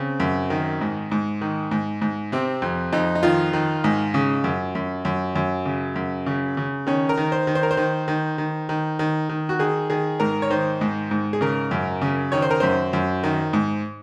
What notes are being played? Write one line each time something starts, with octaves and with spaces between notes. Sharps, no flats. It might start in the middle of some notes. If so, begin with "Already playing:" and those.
Already playing: C#3 C4
F#2
D#3
G#2
G#2
D#3
G#2
G#2
C3 C4
F2
F2 D#4
D#4
D#3 F4
D#3
G#2
C#3
F#2
F#2
F#2
F#2
C#3
F#2
C#3
C#3
D#3 C#4
A#4
D#3
C5
D#3
C5
A#4
C5
D#3
D#3
D#3
D#3
D#3
D#3
F#4
D#3 G#4
D#3 G#4
G#2 A#4
C#5
D#3 C5
G#2
G#2
G#4
C#3 A#4
F#2
C#3
D#3 C#5
C5
A#4
F#2 C5
F#2
D#3
G#2